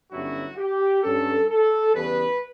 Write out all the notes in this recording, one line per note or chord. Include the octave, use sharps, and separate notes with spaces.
G1 G2 F#3 C#4 E4 F#4
G4
G2 F#3 C#4 A4
A4
E2 C#3 G3 B4